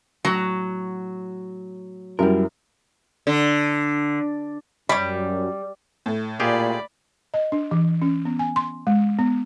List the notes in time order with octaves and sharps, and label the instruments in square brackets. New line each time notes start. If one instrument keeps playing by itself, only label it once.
[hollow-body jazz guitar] A2 [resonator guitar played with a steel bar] F#3
[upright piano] F#2 E4 [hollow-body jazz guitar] G3 A#4
[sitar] D3
[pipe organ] F#2 [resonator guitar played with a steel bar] G3 [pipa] C#5 B5
[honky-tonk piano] A2 A3
[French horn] A#2 [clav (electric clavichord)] F4 G4 G#4 [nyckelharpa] D5 B5
[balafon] D#5
D4
E3
C#4
B3
G#5
C6
G#3
B3